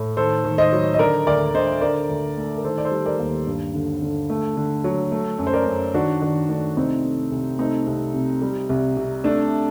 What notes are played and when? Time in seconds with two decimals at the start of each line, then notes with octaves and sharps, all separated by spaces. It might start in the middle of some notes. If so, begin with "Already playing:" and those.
Already playing: A2
0.17 D#3 A4 C5
0.45 D#3
0.58 C5 D#5
0.73 F#3
0.94 D#5
0.99 D3 A#4 D5
1.27 D2 A#4 D5
1.54 D3 C5 D#5
1.81 D3 A#4 D5
2.09 D2
2.37 A3
2.57 A#4
2.64 D#3 A4 C5
2.78 D5
2.85 A4 C5
2.92 G3
3.06 A#4 D5
3.19 D#2
3.47 G2
3.74 D3
4.02 D3
4.30 A3
4.57 D3
4.84 F#3
5.12 A3
5.39 F#2
5.47 C5
5.53 A#4 D5
5.67 F#2
5.94 D#3 D4 F#4
6.22 D#3 D4
6.49 A3 D4
6.77 C2 C4 D#4
7.04 A3
7.32 C2
7.59 A3 C4 D#4
7.87 C2
8.14 C3
8.42 G3
8.69 C2
8.97 C3
9.24 A3 D4